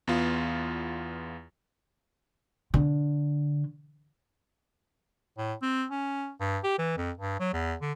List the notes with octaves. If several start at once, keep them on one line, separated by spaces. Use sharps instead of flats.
E2 B3 F4
D3
A2
C4
C#4
G2
G4
E3
F2
G2
F#3
E2
D3